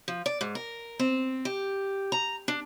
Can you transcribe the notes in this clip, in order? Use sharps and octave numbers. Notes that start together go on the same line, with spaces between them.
F3
D5
G#2
A#4
C4
G4
A#5
D4